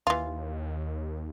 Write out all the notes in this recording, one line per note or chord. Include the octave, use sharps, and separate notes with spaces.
D#2 E3 F4